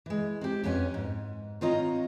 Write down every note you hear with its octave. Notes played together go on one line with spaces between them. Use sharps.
E3 G#3
C4 G4
F2 B3 C#4 G#5
G#2
D#3 C4 F4 C#5 D#5 A#5